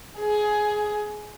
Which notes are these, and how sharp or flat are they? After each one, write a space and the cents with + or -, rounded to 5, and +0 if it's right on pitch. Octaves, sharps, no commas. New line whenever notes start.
G#4 +15